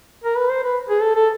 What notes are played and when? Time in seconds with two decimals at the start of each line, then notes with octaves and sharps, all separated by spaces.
0.24 A#4
0.37 B4
0.50 C5
0.63 B4
0.89 G#4
1.02 A4
1.15 A4